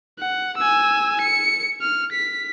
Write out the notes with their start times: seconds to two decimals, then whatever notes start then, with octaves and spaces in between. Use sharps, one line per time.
0.20 F#5
0.58 G#5 E6
1.21 C#7
1.82 F6
2.12 B6